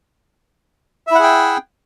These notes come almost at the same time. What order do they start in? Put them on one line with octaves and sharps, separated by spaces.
E5 E4 F#5 G#4 G5